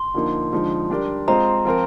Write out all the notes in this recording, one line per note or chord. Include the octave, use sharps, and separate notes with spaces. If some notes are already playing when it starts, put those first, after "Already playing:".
Already playing: C6
D3 F3 A#3 D#4
D3 F3 G#3 D#4
G3 D4 G4 A#4 D5
G#3 C4 F4 C5 D#5 A#5
F3 C4 F4 A#4